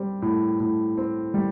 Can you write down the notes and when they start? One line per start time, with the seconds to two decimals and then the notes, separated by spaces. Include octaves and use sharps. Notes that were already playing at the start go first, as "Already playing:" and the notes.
Already playing: G3 C4
0.22 A2
0.60 A2
0.97 C4
1.34 G3